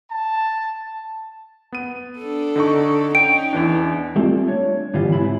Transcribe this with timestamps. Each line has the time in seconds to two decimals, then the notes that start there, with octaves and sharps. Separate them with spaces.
0.11 A5
1.72 B3 D#7
2.19 D4 A4
2.56 D3 D#4 C#6
3.15 C#4 D#4 G5 D7
3.53 E2 E3 D4
4.16 G3 A3 C4 F4 A4
4.47 D4 C#5
4.94 G2 D3 E3 G3 B3 F4
5.12 G#2 C3 E4 B5